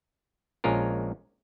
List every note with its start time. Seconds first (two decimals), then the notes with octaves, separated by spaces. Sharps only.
0.64 A#1 G#3 C#4 F4 A#4